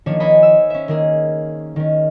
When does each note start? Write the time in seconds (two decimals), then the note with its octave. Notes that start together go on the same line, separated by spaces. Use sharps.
0.06 D#3 F3 A#3 C#4 D4 C#5
0.20 C5 C#5 D#5 G#5 B5
0.43 E6
0.70 C#4 E5
0.88 D#3 A#3 G#4
1.76 D#3 C#4